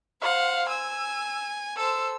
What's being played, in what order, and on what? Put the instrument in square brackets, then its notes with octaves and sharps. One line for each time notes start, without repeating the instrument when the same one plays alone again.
[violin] C5 F#5 [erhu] F5
[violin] G#5 [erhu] E6
[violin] A4 C5 [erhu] E6